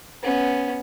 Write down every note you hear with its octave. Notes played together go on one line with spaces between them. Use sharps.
B3 C#4